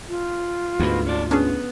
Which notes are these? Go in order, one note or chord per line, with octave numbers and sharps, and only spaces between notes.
F4
D2 G#2 B2 F#4 B4
C#4 D5
B3 C#4 D4 G#4